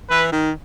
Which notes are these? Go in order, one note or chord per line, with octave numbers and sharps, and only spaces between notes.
E3 B4
D#3